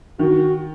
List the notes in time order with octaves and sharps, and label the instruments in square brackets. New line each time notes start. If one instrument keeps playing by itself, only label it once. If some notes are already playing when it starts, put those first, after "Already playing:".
[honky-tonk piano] D#3 [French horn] F#4